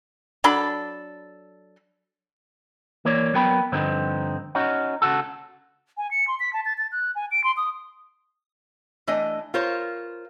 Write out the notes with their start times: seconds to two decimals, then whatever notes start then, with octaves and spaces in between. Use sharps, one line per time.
0.44 F#3 D4 A4 B5
3.05 E3 A#3 C#5 D5
3.34 F#3 B3 A#4 G5 B5
3.72 G2 D3 F3 C4 D#4
4.55 C#4 D#4 F#4
5.02 C#3 F#4 A4
5.97 G#5
6.11 C#7
6.28 C6
6.40 B6
6.53 A5
6.65 A6
6.78 A6
6.92 F#6
7.15 G#5
7.31 D7
7.44 C6
7.57 D#6
9.07 E3 A3 D4 D#5
9.54 F4 A#4 C5 C#5